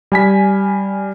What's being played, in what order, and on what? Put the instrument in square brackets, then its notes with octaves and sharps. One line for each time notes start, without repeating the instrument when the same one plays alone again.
[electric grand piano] G3 G#5 B6